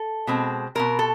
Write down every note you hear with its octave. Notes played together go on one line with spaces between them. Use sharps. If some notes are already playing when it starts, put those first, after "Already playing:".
Already playing: A4
B2 G#3 C4
B2 G#3 C4 A#4
A4